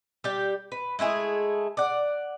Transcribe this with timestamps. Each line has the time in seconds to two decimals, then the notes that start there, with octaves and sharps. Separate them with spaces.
0.24 G3 G4
0.72 B4
0.99 G#3 A3 E4 G#4
1.77 D5 F#5